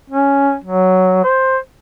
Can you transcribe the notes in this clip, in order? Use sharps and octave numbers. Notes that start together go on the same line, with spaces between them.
C#4
F#3
C5